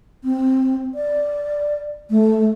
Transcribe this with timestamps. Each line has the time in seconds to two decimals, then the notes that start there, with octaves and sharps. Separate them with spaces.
0.24 C4
0.95 D5
2.10 A3